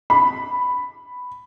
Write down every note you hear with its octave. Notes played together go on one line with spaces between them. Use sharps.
B5